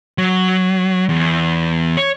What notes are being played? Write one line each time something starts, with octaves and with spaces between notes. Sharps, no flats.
F#3
E2
C#5